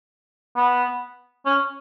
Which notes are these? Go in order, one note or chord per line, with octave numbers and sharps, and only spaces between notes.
B3
C#4